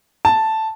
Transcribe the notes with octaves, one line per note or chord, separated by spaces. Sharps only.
A5